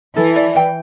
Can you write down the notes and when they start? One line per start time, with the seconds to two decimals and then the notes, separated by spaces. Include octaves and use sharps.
0.16 E3 A4
0.36 D5
0.56 G5